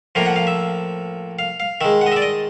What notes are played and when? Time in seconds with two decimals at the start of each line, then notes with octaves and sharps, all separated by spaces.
0.15 A2 F3 A#3 F5
0.26 F#5
0.36 F5
0.47 E5
1.39 F5
1.60 F5
1.81 D#3 G#3 E5
2.02 F#5
2.06 D#5
2.12 E5
2.16 D5
2.22 D#5